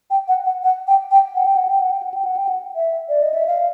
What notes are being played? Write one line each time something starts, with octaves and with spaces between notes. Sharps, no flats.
G5
F#5
F#5
F#5
G5
G5
F#5
G5
F#5
G5
F#5
G5
F#5
G5
F#5
G5
F#5
E5
D5
D#5
E5
F5